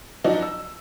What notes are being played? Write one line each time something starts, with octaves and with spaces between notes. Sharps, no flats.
F3 F#3 D4 D#4 F#4
E6